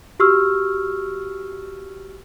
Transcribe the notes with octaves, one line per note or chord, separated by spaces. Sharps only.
F#4 G4 C#6 E6 F6